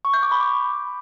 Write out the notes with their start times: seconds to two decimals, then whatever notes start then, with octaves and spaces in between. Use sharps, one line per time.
0.05 C#6
0.14 G6
0.23 D6
0.32 B5
0.40 D6